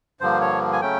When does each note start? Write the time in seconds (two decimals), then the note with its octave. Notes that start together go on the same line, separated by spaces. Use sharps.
0.20 G2 D3 F3 A#3 C5
0.41 C#5
0.73 G#5
0.81 C#3 F#3 A3 C#4 G5